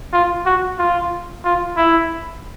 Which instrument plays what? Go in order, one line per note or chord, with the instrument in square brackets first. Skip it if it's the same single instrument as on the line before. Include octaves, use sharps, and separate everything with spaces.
[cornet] F4
F#4
F4
F4
E4